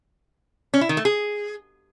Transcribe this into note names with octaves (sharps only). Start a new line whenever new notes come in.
C#4
E4
D#3
A3
G#4